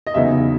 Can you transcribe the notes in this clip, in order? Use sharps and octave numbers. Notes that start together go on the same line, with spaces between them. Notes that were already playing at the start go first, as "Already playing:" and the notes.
D#5
E2 C#3 F#3 B3 D#4 E5